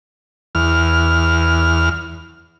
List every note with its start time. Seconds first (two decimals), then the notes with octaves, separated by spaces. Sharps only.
0.55 E2 F6